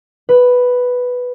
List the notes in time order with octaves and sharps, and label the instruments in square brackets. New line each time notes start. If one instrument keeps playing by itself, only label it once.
[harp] B4